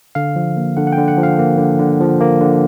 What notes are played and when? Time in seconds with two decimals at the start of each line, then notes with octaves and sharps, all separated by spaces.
0.15 D3 F5
0.36 F3
0.57 A#3
0.77 D3 F#5
0.87 F#5
0.92 G5
0.98 D3
1.08 F#5
1.18 F3
1.23 F5
1.39 A#3
1.59 D3
1.79 D3
2.00 F3
2.20 A#3
2.41 D3